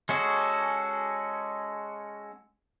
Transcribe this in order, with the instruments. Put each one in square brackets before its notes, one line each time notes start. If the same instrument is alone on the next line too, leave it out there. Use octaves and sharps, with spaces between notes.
[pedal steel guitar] G#3 C#4 F#4 G#4 A4